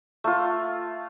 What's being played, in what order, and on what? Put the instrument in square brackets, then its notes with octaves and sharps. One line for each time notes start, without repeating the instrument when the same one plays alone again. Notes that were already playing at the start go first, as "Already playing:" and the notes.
[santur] A3 F4